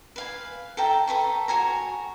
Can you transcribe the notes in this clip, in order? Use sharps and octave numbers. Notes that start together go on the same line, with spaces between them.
B4 F5 G#5
A4 E5 G5 A#5
A4 B4 A#5 C#6
F#4 C#5 G#5 A#5